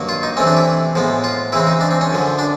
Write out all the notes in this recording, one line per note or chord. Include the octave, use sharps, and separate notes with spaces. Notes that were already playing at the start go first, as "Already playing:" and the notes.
Already playing: G2 D#3 F#3 A#3
F4
D#4
C3 E3 A3 C4 C#4
D4
E4
A2 F3 G#3 B3
F4
C#3 E3 G#3 C4 E4
D#4
D4
C4
C#4
F#2 D3 F3
D4